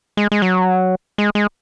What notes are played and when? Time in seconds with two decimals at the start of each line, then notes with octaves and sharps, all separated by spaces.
0.17 G#3
0.32 G#3
0.42 F#3
1.18 G#3
1.35 G#3